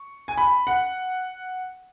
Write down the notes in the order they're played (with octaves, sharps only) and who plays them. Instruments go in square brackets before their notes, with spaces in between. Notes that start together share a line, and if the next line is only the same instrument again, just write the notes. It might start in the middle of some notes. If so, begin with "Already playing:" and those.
Already playing: [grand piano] C#6
G#5
B5
F#5